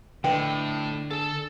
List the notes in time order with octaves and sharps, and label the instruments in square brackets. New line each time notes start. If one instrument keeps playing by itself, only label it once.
[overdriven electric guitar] A2 [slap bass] D3 [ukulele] B4 D#5 G5
[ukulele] G#4 [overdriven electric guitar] A4 A5